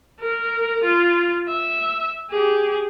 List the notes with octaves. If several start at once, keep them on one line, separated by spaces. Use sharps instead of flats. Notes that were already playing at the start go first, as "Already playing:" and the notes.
A#4
F4
E5
G4 G#4